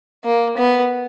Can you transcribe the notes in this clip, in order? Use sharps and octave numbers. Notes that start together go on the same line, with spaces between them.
A#3
B3